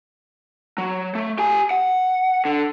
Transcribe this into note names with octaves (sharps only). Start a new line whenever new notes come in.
F#3
A3
G4 G#5
F#5
D3